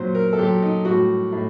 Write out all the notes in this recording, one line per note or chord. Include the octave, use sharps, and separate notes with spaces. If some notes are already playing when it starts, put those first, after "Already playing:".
Already playing: A#2 F#3 C5
A#4
A4
A#2 F#3 G4
D#4
A2 G3 F#4
A2